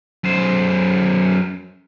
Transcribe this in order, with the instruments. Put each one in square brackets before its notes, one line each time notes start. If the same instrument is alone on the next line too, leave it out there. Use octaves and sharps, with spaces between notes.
[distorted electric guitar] F#2 C5